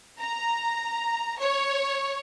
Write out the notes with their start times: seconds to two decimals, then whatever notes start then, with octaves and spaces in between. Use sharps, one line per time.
0.19 A#5
1.39 C#5